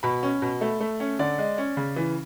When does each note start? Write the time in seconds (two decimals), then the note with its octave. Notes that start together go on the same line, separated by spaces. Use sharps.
0.03 B2 B5
0.23 C#4
0.42 B2
0.61 A3
0.80 A3
1.00 C#4
1.19 D3 D5
1.38 G#3
1.58 C#4
1.77 C#3
1.96 E3